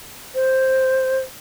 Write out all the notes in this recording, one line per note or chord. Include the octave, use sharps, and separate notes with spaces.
C5